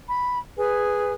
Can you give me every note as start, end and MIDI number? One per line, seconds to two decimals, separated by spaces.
0.07 0.38 83
0.57 1.12 68
0.57 1.12 71
0.57 1.12 80